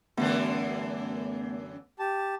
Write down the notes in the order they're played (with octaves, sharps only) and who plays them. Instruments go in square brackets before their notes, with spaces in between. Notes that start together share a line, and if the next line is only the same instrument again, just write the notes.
[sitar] F#2 D3 E3 [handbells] A3 B3
[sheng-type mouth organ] G4 A5